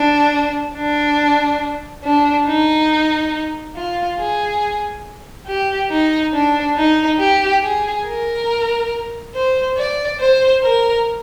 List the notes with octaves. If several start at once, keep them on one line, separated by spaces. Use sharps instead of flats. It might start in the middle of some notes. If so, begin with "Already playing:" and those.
Already playing: D4
D4
D4
D#4
F4
G#4
G4
D#4
D4
D#4
G4
G#4
A#4
C5
D5
C5
A#4